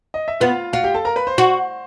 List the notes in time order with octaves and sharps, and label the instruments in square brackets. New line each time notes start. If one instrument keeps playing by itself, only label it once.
[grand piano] D#5
E5
[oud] B3 [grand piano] F4 F5
[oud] F4 [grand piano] F#4 F#5
[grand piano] G4 G5
A4 A5
A#4 A#5
B4 B5
C5 C6
[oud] F#4